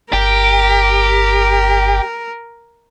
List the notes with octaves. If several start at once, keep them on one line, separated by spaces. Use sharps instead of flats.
G1 G4 A#4